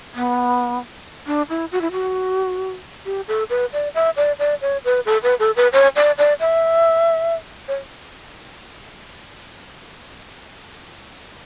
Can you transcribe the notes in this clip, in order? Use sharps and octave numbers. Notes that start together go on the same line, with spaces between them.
B3
D4
E4
F#4
E4
F#4
G4
A4
B4
D5
E5
D5
D5
C#5
B4
A4
B4
A4
B4
C#5
D5
D5
E5
C#5